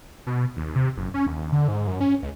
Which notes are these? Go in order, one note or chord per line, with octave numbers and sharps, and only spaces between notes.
B2
D#2
C3
F#1
C#4
D#2
D3
G#2
F#2
C#4
C#2